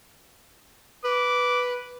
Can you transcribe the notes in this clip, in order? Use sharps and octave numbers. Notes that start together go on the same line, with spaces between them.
B4 D6